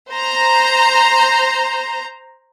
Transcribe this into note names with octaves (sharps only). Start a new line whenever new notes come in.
C5 A#5